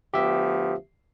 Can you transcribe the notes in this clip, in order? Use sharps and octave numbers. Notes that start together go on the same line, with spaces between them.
D2 F3 B3 G4 E5